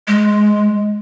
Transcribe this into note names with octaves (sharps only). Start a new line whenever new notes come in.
G#3